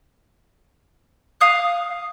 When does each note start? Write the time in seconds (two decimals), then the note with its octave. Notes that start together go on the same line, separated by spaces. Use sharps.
1.41 F5 D#6 F#6